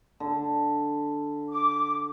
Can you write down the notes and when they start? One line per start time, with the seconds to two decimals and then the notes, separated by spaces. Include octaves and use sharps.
0.20 D3
1.51 D6